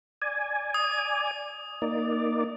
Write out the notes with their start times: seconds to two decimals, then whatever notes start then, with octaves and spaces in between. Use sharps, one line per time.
0.22 D5 G#5
0.74 D#6
1.82 A#3 D#4 D5